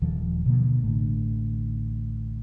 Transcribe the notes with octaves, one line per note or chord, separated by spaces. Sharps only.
D#1 D#3 F3 G3
B2 D3 A#3
A1 A2 D3